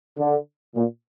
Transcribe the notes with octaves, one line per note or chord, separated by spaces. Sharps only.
D3
A#2